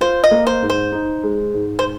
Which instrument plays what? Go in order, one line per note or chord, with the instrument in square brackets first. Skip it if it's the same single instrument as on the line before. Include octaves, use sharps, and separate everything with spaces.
[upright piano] F4 [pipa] C5
[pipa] D#5
[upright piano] A#3
[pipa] C5
[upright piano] G#2
[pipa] C5
[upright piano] D#4
G#3
G#2
[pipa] C5